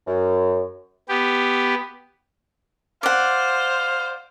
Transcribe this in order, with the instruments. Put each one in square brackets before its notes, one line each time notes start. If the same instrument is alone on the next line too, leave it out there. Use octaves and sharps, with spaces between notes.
[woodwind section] F#2
[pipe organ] B3 G4
[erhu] C5 [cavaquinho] D5 F#5 [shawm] F5